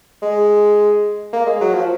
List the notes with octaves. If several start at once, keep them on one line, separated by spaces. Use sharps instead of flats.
G#3
A#3
G#3
F#3
F3